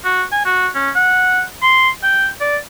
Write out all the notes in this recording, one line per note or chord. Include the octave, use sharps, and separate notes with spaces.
F#4
G#5
F#4
C#4
F#5
C6
G5
D5